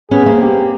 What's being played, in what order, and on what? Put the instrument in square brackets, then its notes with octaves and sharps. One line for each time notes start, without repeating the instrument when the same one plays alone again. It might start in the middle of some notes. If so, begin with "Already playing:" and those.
[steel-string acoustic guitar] B3 C#4 [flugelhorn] G#4
[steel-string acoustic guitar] A#3 C4
[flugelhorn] G4